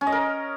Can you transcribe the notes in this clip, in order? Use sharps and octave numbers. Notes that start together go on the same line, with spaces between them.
C#4
D#5
A#4